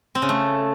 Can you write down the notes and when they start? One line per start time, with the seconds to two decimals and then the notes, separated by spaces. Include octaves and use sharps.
0.15 C4
0.22 C#3
0.29 A3